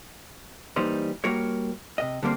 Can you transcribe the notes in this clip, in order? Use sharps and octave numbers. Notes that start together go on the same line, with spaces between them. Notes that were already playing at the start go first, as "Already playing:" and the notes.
E3 G3 A#3 D#4 C5
G3 A#3 F#4 A#4 C#5
C3 D#5
D3 G3 A#3 C4